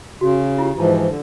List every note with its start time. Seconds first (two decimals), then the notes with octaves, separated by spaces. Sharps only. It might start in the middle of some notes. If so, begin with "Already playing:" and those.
0.21 C#3 F#4
0.58 E4 F4 G4
0.76 G#2 E3 F3 E4 A5
1.08 D3